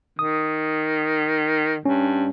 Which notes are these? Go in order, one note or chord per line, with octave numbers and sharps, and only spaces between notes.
D#3 D#6
G2 C#4